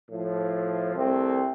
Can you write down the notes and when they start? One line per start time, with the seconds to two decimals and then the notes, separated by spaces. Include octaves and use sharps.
0.11 A2 F3
0.95 C2 A3 C4